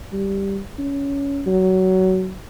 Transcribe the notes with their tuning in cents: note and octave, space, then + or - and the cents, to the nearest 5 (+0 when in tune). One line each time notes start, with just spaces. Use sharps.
G3 +0
C#4 +15
F#3 +20